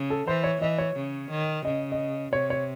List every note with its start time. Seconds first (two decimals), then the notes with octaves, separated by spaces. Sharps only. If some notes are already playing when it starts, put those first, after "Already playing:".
Already playing: C#3
0.10 A4
0.27 E3 C5
0.44 C#5
0.61 E3 D#5
0.78 C#5
0.96 C#3
1.31 D#3
1.65 C#3 D#5
1.92 D#5
2.33 C3 C#5
2.50 C#5